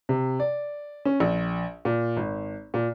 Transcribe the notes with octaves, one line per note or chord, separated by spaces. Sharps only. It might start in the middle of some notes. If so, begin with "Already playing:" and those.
C3
D5
C#4
A#1
A#2
G#1
A#2